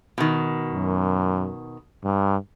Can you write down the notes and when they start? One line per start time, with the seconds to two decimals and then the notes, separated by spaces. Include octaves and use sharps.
0.18 B2 D#3
0.71 F#2
2.04 G2